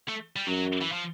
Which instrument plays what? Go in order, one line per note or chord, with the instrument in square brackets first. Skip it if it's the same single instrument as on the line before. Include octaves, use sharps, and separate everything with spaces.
[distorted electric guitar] A3
G3
[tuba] F#2 [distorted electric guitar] F#3
[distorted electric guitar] E3
F3